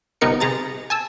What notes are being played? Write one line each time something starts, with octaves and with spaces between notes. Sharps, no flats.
G1 C3 B3 D#4 A#4 C#7
C3 G#4 A#5 A6
G#5 A5 E6